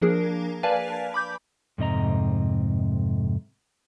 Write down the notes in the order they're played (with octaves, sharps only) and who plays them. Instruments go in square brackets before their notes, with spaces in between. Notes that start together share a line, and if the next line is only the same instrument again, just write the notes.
[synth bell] F3 A#3 D4 G#4 A#4
B4 D5 F5 G#5 A5
B5 D6 G6
[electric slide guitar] F2 G#2 C3 D#5 A#5